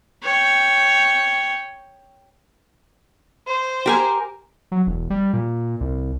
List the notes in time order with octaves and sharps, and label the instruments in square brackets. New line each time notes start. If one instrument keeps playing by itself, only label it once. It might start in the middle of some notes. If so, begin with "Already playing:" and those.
[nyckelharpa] C#5 G5
[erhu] C5
[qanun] G4 A#4 G#5
[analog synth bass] F#3
E1
G3
A#2
C2